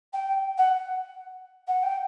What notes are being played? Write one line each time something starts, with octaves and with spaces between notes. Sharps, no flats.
G5
F#5
F#5
G5